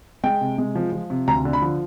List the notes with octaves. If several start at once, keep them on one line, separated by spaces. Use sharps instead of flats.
G#3 G5
C3
G#3
F3
F3
C3
D2 A#5
D3
B5
F3